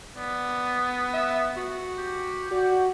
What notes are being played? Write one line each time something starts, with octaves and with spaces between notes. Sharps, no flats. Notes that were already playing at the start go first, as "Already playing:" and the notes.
B3 D5
E5
F#4
G4
F#4 D5